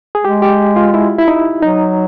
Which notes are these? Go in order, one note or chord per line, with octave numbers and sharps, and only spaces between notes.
G#4
G#3 G4
G4
F4
E4
E4
D#4
F#3 D#4